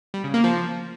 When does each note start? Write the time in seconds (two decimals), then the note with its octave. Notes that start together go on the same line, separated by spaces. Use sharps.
0.14 G3
0.24 C#3
0.34 A#3
0.44 F3